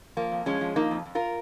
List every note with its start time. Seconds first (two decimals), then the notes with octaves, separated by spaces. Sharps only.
0.17 F3 A#3
0.32 F2
0.46 F3 G#3 C#4
0.61 F3
0.76 F3 A#3 D#4
0.91 F2
1.06 F2
1.15 F4 A#4